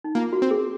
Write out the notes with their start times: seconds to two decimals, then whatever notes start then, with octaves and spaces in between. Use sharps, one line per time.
0.04 D#4
0.15 A#3 F4
0.33 F#4
0.42 C4
0.51 G#4